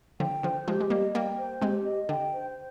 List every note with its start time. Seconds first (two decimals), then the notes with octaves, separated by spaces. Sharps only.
0.19 D3 F3 G5
0.43 D3 F3 C5
0.68 F3 G#3 G4
0.81 G#3
0.90 G3 A#3 D#5
1.15 G3 A#3 G5
1.39 C5
1.62 G#3 C4 G4
1.85 D#5
2.09 D3 G5
2.32 C5